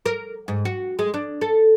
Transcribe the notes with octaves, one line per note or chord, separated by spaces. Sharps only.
A#4
G#2
F#4
G#3
D4
A4